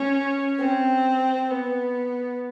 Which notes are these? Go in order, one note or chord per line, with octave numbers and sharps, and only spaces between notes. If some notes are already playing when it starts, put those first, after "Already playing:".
Already playing: C#4
C4
B3